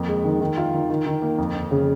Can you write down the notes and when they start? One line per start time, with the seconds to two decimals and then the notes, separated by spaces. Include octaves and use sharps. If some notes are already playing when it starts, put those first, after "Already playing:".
Already playing: F2 A#3
0.08 G#3
0.24 D#3
0.41 D#3
0.57 F4
0.74 D#3
0.90 D#3
1.06 D#3
1.22 A#3
1.38 F2
1.55 F2
1.71 C#3